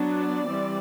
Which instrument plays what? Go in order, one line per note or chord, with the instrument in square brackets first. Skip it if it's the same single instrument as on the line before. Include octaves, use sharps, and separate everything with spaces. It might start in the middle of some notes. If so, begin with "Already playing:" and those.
Already playing: [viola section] F#3 B3 D4
D5
E3 G3 C4